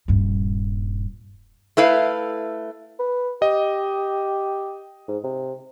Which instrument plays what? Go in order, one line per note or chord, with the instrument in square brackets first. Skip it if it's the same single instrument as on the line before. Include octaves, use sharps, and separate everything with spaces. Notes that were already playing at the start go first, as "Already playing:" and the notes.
[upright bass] D#1 G2
[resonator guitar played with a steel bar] A3 E4 B4 F5
[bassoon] B4
[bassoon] G4 [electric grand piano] D#5
[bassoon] G#2
C3